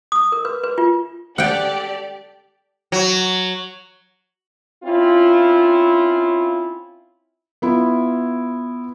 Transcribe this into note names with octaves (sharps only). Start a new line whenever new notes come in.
D#6
A#4
B4
B4
F4
G4 A4 D5 F#5 G5
F#3
C4 C#4 E4 F4
B3 E4 F4